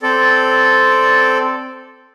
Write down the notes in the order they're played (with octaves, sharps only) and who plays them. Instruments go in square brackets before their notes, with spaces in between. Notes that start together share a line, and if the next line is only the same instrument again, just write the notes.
[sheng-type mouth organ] C4 A4 D5